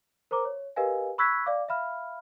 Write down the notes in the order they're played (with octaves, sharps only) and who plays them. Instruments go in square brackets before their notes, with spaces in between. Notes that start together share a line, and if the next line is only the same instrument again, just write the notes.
[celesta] A#4 C5 A#5 D6
C#5
G4 A#4 B4 D#5 F5 G#5
B5 C#6 E6 F#6 G#6 B6
D5 F5 D6
E5 F5 B5 F6